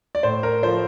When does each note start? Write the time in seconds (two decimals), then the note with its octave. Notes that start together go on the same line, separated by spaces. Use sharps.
0.15 D5
0.23 A2 C5
0.43 A#4
0.63 F3 A3 C5